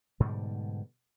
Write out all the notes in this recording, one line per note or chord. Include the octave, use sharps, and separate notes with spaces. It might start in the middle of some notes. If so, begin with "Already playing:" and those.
G#2 B2 D3 G3